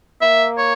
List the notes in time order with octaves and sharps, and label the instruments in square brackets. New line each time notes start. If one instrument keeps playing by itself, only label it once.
[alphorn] A#3 [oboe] E5
[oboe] C#5